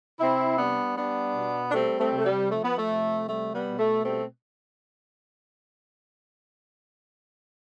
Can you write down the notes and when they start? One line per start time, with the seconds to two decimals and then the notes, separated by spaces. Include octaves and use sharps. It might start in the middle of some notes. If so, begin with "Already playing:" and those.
0.20 C3 C4 E4
0.58 G3 B3 D4
0.98 G3 B3 D4
1.35 B2
1.69 D4
1.74 G3 A3 C4
1.99 A3 C4
2.12 C3
2.18 A3
2.25 G3
2.50 F3 A3
2.63 B3
2.77 A3
2.88 C3
3.27 G3 A3
3.52 G3 B3
3.66 B2
3.79 A3
4.04 G3 A3 C4